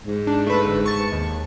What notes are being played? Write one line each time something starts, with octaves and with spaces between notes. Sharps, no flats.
G#2
D4
A3 B4
G1
A5 C#6
D#2